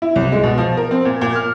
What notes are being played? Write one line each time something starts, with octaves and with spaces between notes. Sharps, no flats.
E4
C2
G#3
B2
F3
A#4
C4
A#2
A#2
F6